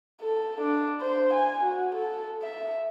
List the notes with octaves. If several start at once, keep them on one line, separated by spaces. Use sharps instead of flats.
A4
D4
C5
G#5
F#4
A4
E5